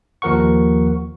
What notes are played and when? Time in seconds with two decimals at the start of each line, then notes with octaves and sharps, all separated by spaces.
0.22 D#2 F3 A#4 F#5 C#6